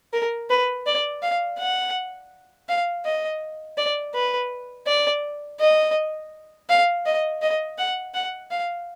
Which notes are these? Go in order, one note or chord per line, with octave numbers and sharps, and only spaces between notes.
A#4
B4
D5
F5
F#5
F5
D#5
D5
B4
D5
D#5
F5
D#5
D#5
F#5
F#5
F5